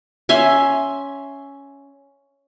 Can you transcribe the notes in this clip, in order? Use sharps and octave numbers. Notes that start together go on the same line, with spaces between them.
C#4 E5 G#5 C6